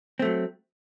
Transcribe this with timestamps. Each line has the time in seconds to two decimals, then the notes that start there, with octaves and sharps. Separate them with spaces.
0.19 C4
0.22 A3
0.25 F#3